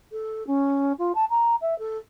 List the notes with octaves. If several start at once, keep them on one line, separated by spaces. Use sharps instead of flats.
A4
C#4
F4
A5
A#5
E5
A4